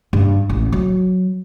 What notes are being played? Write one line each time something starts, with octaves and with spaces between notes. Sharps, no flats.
G2
A1
F#3